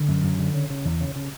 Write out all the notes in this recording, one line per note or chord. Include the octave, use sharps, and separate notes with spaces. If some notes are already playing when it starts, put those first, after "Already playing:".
Already playing: D3
F#2
F#2
D3
C#3
C#3
E2
C#3
C#3